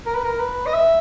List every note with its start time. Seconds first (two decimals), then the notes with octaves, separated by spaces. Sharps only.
0.06 A#4
0.15 B4
0.24 A#4
0.40 B4
0.66 D#5
0.73 E5